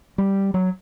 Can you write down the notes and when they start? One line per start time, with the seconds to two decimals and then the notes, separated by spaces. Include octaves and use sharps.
0.18 G3
0.54 F#3